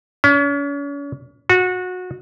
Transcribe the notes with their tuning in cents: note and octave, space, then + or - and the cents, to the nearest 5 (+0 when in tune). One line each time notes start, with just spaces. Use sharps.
C#4 +40
F#4 -20